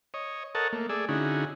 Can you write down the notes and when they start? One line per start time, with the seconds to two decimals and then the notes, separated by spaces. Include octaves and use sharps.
0.14 C#5 D#5
0.55 A4 A#4 C#5 D#5 F#5 A5
0.73 A3 A#3
0.89 A3 G#4 D5 E6
1.09 D3 C#4 D#4 E4 F#4 G#4